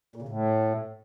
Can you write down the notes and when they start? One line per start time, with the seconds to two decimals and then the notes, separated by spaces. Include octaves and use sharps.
0.16 A#2
0.22 C#3
0.28 A2